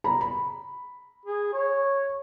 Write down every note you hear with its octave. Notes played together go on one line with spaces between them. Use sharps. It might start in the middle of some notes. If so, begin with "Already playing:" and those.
A#5 B5
B5
G#4
C#5